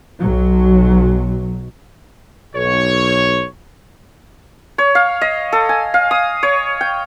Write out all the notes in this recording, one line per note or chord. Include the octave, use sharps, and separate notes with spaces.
B1 F#3
B1 C#5
C#5
F5
D#5
A4
G#5
F5
D#6
C#5
G5